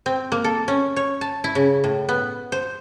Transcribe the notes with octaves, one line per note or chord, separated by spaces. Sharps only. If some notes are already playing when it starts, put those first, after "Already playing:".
C4
A#3
A4
C#4
C#5
A5
E4
C#3
A2
B3
C5